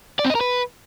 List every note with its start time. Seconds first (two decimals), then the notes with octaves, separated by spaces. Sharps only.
0.19 D5
0.25 C4
0.30 D#5
0.35 A#4
0.41 B4